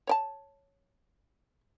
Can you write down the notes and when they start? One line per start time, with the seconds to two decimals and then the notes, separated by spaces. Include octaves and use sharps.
0.07 C#5 D5 A5